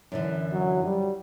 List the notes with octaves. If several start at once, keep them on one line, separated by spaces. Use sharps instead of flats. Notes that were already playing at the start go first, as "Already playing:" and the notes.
F#2 D3 E3
F#3
G3